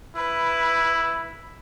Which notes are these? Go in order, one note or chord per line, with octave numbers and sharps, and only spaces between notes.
E4 B4